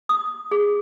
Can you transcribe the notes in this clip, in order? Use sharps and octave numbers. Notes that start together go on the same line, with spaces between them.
D#6
G#4